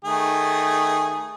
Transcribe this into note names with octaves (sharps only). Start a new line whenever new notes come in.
D#3 A3 G#4